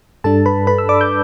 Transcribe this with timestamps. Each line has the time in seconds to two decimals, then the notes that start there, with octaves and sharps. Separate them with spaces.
0.24 G2 G3 D4 A4 A5
0.46 B4 B5
0.67 B4 B5
0.78 E6
0.89 D5 D6
1.01 G6